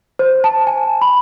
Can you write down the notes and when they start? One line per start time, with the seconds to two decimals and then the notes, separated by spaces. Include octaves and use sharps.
0.19 C5
0.44 A5
0.67 G#5
1.01 B5